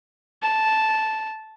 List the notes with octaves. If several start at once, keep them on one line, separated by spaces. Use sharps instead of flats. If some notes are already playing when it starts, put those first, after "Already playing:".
A5